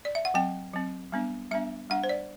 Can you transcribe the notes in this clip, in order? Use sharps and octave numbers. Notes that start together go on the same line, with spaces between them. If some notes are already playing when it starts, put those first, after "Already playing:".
D5
E5
F#5
F#3 C4 G5
F#3 C4
G3 B3 D4
G3 B3 D4 E5
G3 D4 F#5
C5
D5